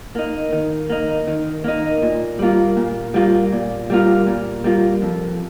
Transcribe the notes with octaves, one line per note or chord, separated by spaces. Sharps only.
A#3 D#4
D#3
A#3 D#4
D#3
A#3 D#4
A#2
G3 A#3 F4
A#2
G3 A#3 F4
A#2
G3 A#3 F4
A#2
G3 A#3 F4
F2